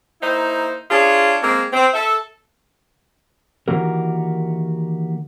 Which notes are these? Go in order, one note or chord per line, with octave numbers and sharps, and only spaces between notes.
A#3 D#4 E4 C5
D4 F4 G#4 C#5
G#3 A#3 C4
C4
A4 E5
D#3 E3 A#3 F#4 G4 A#4